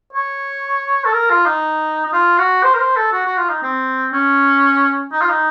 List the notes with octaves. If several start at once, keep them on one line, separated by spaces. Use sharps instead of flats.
C#5
A4
A#4
F4
D#4
D#4
F4
F#4
C5
A#4
C5
A4
F#4
F#4
F4
D#4
C4
C#4
D#4
F4
D#4